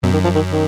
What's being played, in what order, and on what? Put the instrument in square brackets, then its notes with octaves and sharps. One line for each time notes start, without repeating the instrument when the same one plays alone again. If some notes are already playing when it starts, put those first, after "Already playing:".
[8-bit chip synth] F#2 [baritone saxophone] B2
[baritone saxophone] D#3
F3
D#3
D#3